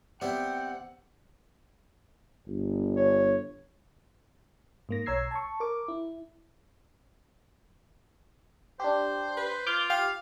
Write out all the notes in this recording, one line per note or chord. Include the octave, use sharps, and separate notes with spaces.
G3 B3 C4 E4 F#5 G5
G1
C#5
G#2 A#3 A#6
B1 C#5 A#5 E6 G#6 C7
A5 C#6
A#4 D6
E4
D4 G4 C5
B4
F4 D6 F6 G6
G4 F5